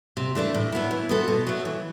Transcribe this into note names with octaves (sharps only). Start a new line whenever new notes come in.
C3
E3 A3 D4 A4
A2
F#3 B3 E4
E3
B3 F#4 A4 C5
B2
F#3 A3
E3